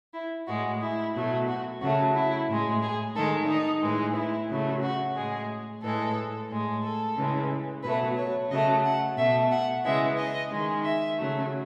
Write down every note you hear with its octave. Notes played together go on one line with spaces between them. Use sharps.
E4
A2 G#3 F#4
E4
B2 F#3 A3
F#4
C#3 F#3 A3 F#4
E4
A2 G#3
G#4
D#3 G#3 A4
D#4
A2 E3 G#3
E4
C#3 F#3 A3
F#4
A2 G#3 G#4
A2 E3 G#3 A4
A2 G#3
A4
C#3 E3 G#3
B2 F#3 A3 B4
C#5
C#3 F#3 A3 D#5
F#5
B2 A3 E5
F#5
C#3 E3 G#3 E5
D#5
D#3 G#3
E5
C#3 F#3 A3